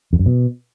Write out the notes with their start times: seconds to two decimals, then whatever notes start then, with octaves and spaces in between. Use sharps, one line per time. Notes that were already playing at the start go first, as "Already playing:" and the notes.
0.13 F2
0.19 F#2
0.26 B2